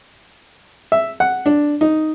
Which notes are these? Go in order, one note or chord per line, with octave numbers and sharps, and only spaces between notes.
E5
F#5
D4
D#4